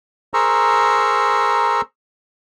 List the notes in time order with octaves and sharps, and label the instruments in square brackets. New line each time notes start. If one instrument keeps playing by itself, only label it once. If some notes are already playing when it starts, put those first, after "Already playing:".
[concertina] G#4 A#4 C5 A#5 C#6 E6